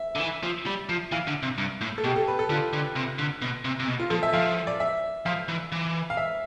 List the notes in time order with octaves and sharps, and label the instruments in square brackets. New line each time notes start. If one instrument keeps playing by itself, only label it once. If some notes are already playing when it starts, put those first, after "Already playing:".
Already playing: [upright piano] E5
[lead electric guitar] D3
E3
F3
G3
F3
[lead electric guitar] E3 [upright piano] F5
[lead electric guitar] D3
C3
G2
A2
[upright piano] A4
[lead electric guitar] B2 [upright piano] G4
[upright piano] A4
B4
A4
[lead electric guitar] D3 [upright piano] F4
[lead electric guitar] D3
C3
D3
B2
C3
C3
B2
[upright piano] F4
[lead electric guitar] F3 [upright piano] A4
[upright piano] E5
[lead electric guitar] F3 [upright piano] F5
[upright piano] D5
E5
[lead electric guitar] F3 [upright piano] F5
[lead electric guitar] E3
E3
[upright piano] F5
E5